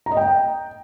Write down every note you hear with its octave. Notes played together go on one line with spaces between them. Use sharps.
A#5
D#5
G5